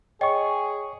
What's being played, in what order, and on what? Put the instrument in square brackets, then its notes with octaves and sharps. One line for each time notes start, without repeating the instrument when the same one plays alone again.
[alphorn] G#4 [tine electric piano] C#5 C#6 [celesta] D#5 G5